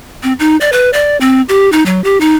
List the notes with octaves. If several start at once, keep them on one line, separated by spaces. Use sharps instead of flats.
C4
D#4
D5
B4
D5
C4
G4
D#4
F#3
G4
D#4